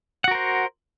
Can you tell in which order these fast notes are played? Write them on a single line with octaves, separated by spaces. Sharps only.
F#5 F#4 A#4 C5